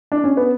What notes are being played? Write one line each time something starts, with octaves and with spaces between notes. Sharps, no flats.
D4
C#4
B3